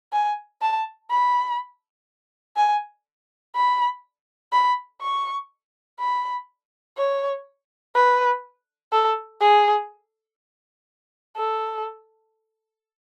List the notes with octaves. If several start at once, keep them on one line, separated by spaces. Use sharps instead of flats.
G#5
A5
B5
G#5
B5
B5
C#6
B5
C#5
B4
A4
G#4
A4